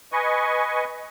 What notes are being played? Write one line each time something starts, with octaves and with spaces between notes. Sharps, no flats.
B4 D#5 G#5 C#6